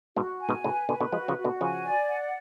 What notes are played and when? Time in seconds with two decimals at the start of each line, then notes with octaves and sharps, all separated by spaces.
0.16 G#2 B2 F#4
0.41 G#5
0.49 G#2 B2
0.64 A2 C#3 B4
0.89 B2 D3 B4
1.00 B2 D3
1.12 F3 G#3 F#4
1.28 C#3 F3
1.37 F#4
1.44 B2 D3
1.61 C#3 F3 G#5
1.85 D5
2.09 F#5